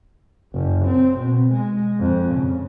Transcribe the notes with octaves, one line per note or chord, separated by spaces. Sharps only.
F#1
C4
B2
G#3
F2
C#3